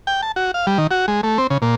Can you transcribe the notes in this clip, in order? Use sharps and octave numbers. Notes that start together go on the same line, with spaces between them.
G5
A5
F#4
F5
G3
D#3
F#4
G#3
A3
C4
C#3
A#2